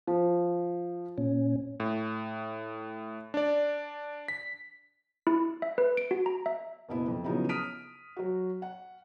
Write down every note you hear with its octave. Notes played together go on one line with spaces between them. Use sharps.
F3
A#2 C#4
A2
D4 D5
B6
E4
E5
B4
D7
F#4
A#5
E5
F#1 B2 B3 E4
F2
C#3 F3 F#3 B3 D#4 E4
D#6 F6 B6 D7 D#7
F#3 F#4
F#5